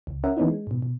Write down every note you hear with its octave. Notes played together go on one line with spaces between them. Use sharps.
C#2
C#4 A#4 E5 F#5
E3 A#3 B3 C#4 D#4 E4
G#3
G#2 B2
B2